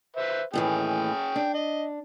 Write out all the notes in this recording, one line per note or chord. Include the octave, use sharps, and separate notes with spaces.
B4 C5 E5
D#2 A2 E3 C#4 G#4 G5
D4
D#5